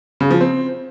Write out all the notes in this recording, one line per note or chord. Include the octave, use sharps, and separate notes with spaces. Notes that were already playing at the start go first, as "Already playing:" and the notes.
C#3
F3
C4